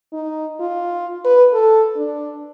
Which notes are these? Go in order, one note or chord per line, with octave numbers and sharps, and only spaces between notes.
D#4
F4
B4
A4
D4